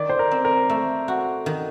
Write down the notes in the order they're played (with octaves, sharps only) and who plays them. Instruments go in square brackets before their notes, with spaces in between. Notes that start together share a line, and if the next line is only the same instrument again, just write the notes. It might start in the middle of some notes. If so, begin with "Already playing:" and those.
Already playing: [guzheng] D#3 [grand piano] D5
[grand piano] C5
A#4
[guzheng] C4
[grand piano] A#4
[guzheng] A3 [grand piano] A4
[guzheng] F#4
D#3